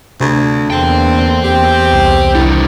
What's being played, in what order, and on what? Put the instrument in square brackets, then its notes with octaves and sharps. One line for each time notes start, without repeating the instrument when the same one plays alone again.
[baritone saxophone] D2 [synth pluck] C3 G#6
[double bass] E2 A#3 [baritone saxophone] D3 [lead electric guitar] C5 G5
[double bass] E2 [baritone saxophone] G4
[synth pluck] C2
[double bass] C2 [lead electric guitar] D3 D#3 [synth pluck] E4